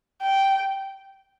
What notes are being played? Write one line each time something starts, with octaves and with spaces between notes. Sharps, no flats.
G5